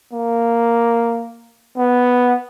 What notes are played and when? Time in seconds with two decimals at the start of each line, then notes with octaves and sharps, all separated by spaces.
0.13 A#3
1.77 B3